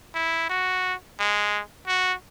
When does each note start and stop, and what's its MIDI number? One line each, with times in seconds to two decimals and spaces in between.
0.15 0.48 64
0.50 0.94 66
1.20 1.61 56
1.87 2.13 66